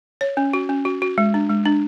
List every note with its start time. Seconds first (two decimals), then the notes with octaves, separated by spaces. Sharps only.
0.21 C#5
0.37 C#4
0.53 F#4
0.69 C#4
0.85 F#4
1.02 F#4
1.18 G#3
1.34 D4
1.50 G#3
1.65 D4